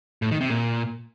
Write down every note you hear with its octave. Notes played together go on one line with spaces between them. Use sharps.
A2
D#3
C3
A#2